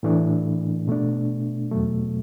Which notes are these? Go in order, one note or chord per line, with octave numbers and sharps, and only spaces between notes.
A2 E3 A3 D4
B2 A3 D4
E2 B2 F#3 A3